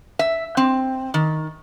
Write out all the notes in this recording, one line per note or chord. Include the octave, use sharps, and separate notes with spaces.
E5
C4
D#3